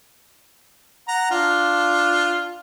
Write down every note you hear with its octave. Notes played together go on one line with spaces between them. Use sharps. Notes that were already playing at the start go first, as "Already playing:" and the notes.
F#5 A#5
D4 F4